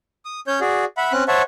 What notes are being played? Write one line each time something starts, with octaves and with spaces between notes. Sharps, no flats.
D#6
C#4 C#5 G6
F#4 G#4 D5
E5 F#5 B5
C4 C#4 F#6
C5 C#5 E5 F#5 A5 C#6